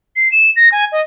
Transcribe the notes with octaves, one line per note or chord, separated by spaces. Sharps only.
C7
E7
A#6
G#5
D#5